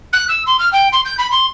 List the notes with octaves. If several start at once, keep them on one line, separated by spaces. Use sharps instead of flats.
F#6
E6
C6
F6
G5
C6
G6
B5
C6